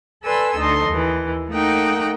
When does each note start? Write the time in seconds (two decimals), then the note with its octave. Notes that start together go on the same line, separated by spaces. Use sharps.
0.24 A4 B4 D5 G#5 C6 E6
0.56 D2 D#4 A4 D#5 C6
0.90 D#2 E3
1.50 A3 A#3 D#4 F#5 G5